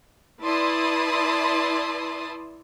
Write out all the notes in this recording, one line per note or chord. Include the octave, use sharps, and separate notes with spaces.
E4 B4 D5 A5 C6 D#6